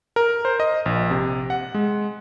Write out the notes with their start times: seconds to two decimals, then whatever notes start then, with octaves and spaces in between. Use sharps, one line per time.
0.16 A#4
0.45 C5
0.60 D#5
0.86 A#1
1.11 C3
1.50 F#5
1.74 G#3